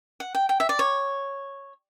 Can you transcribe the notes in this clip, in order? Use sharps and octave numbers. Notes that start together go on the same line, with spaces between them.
F#5
G5
G5
E5
D5
C#5